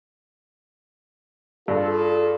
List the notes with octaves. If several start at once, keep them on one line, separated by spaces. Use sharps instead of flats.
G2 F4 G#4 A4